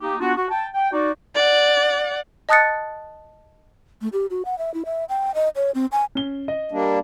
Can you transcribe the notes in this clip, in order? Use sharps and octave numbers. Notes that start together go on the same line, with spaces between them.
A#3 D#4 G4
B3 D4 F4 F#4
F#4
G5 A5
G5
D#4 F#4 D5
D5 F#5
D#5 A5 D#6 F#6 A6 C#7
A3
G4
F#4
F#5
E5
E4
E5
G5
D#5
C#5
C4
G#5
C#4 G7
D#5
G3 A#3 D4